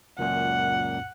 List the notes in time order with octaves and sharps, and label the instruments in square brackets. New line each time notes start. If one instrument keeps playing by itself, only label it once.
[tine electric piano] C#2 F#2 A#2 [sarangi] F#5